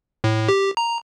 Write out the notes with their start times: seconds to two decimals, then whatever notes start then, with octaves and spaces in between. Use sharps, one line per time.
0.24 A2
0.49 G4
0.77 A#5